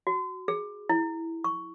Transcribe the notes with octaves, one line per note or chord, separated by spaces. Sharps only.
F#4
G#4
E4
C#6